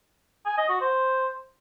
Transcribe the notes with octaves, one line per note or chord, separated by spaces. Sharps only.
G#5
D#5
F#4
C5